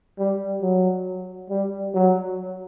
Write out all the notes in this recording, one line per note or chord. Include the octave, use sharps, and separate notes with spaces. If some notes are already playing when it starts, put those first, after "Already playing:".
G3
F#3
G3
F#3